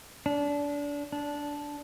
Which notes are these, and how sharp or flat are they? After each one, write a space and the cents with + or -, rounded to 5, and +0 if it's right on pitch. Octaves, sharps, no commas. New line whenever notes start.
D4 -25
D4 -10